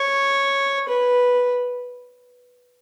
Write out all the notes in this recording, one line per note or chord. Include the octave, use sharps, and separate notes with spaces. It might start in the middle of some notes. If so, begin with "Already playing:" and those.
Already playing: C#5
B4